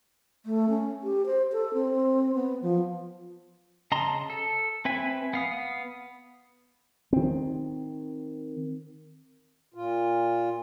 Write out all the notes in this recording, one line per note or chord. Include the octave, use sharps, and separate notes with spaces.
A3
C#4
G4
C5
A4
C4
B3
F3
C#3 D#5 A5 A#5 C6
A4
C4 B4 E5 G#5 B5
B3 F5 D#6
D#3 C4
A#2 F4